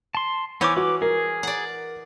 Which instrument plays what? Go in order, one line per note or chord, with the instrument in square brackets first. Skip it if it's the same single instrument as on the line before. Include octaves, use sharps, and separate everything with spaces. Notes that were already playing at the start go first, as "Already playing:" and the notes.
[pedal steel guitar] A5 C6
[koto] E3 C#4 [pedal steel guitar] B3 C5 D6
[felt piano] F#4 [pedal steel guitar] B4 D6
[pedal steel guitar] G#4 [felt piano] A#4
[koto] D5 F#5